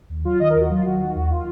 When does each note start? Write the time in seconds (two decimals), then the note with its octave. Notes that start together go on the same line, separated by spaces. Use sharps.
0.09 D#2
0.25 F#3 F4
0.40 D#3 D#5
0.50 A#4
0.55 D#2 F#4
0.70 F#3 F4
0.85 F#3 F#4
1.00 D#3 F#4
1.15 D#2 F#4
1.30 F4